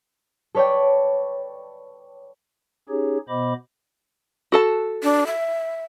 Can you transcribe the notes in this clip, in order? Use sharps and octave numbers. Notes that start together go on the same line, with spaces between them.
A4 B4 C#5 D5 G5
C#4 D#4 G4 G#4 C#5
B2 B3 C5 D#5 B5 D6
F#4 A4 A5
D4
E5